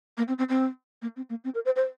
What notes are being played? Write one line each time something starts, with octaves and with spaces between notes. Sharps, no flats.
A#3
C4
C4
C4
A#3
C4
A#3
C4
A#4
C5
C5